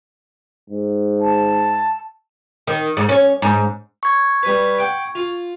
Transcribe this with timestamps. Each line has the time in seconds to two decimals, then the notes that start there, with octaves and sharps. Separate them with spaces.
0.70 G#2
1.21 A5
2.67 D#3
2.97 G#2
3.09 C#4
3.42 G#2
4.03 C#6 G#6
4.43 G3 B4
4.78 F#5 G5 D6
5.15 F4